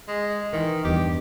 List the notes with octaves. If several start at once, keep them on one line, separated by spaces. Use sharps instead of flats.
G#3
D#3 E3
E2 G2 G4